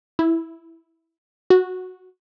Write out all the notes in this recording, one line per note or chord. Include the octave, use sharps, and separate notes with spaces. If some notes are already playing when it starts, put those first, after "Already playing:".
E4
F#4